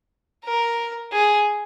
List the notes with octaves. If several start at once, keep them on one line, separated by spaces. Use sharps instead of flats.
A#4
G#4